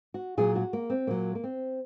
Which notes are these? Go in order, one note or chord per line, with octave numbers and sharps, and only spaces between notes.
F#4
A#2 F#3 G#4
F#4
A#3
C4
A#2 F#3 A#3
A#3
C4